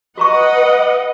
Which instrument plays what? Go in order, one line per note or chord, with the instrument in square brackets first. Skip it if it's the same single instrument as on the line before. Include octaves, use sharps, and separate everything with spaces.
[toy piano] F#4 A#5 C#6 [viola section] B4 D#5 F#5